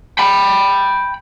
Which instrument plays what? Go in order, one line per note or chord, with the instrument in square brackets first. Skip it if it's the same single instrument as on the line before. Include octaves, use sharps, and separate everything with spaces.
[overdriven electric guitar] G5 B5